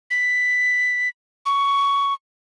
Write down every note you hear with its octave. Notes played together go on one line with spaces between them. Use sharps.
B6
C#6